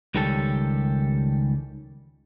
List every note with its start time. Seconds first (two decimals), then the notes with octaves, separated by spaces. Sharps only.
0.15 C#2 D#3 G3 C#4 G4 A4